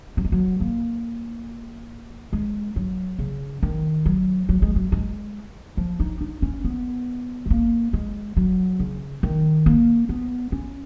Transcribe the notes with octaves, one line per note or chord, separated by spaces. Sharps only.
F#3
G#3
F#3
A#3
G#3
F#3
C#3
D#3
F#3
F#3
G#3
F#3
G#3
F3
D#4
D#4
C#4
B3
G#3
A#3
G#3
F#3
C#3
D#3
A#3
B3
C#4